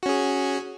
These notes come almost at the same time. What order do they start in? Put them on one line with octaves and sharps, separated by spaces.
F#4 C#4 G#4